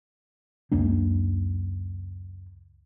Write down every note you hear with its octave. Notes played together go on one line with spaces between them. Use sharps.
C#2 F#2 A#3 D4